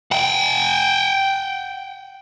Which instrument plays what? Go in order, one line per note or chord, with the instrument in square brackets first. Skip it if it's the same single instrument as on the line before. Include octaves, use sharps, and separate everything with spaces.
[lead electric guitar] F#5 G5